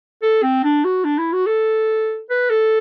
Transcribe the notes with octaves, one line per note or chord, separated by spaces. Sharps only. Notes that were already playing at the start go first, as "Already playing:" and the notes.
A4
C4
D4
F#4
D4
E4
F#4
A4
B4
A4